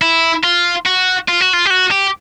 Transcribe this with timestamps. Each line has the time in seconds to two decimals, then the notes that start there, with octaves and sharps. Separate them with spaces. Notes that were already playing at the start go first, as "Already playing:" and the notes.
0.02 E4
0.44 F4
0.86 F#4
1.29 F4
1.41 F#4
1.54 F4
1.66 G4
1.70 F#4
1.91 G4